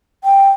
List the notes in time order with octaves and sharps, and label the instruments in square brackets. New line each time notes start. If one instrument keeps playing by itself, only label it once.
[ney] G5